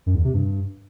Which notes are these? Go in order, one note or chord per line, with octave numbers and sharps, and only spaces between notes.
F#2
E2
C3
G2